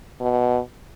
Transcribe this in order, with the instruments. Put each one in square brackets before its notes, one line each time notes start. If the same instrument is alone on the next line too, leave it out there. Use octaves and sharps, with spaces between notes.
[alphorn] B2